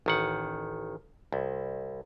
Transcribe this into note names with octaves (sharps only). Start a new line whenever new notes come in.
A1 D#3 F#5
C2